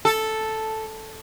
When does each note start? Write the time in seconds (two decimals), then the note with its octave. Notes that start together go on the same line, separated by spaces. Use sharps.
0.05 A4